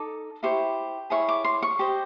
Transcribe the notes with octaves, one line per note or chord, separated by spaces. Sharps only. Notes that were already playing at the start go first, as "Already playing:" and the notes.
Already playing: D#4 A4 D6
E4 G4 C5 C#6
E4 G#4 C#5 C#6
D6
C6
C#6
G4 C5 D#5